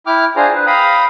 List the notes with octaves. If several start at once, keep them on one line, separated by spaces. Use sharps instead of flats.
E4 G5 D6 F6
D4 F4 G#4 C5 G#5 A#5
B4
F5 G5 A#5 B5 D#6